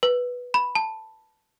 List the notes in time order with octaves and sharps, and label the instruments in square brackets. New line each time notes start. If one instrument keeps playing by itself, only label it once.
[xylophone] B4
B5
A5